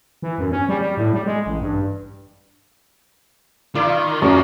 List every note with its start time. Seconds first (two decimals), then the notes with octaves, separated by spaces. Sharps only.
0.22 E3
0.38 F#2
0.52 C#4
0.69 G3
0.81 G3
0.97 A2
1.13 G3
1.26 G#3
1.46 A1
1.61 G2
3.75 D#3 F4 D5
4.22 F#2 A#3 G4 C#6